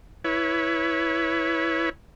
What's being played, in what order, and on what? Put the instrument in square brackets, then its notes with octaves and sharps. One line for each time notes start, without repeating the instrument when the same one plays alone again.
[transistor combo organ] E4 B4 C#5